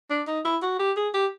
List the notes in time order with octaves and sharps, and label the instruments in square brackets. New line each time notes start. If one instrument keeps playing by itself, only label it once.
[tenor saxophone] D4
D#4
E4
F#4
G4
G#4
G4